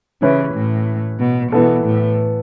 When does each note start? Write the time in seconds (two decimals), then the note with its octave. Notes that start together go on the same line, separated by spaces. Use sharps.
0.22 C#3 E3 C#4 E4 B4
0.55 A2
1.20 B2
1.52 B2 E3 B3 A4
1.85 A2